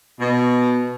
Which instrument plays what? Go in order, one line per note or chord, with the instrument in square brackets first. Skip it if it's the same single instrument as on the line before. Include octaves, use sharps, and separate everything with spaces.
[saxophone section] B2